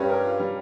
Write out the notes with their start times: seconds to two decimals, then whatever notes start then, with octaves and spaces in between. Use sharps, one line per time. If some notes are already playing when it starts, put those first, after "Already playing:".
Already playing: G2 G3 C#4
0.09 A#4
0.24 F4
0.40 G3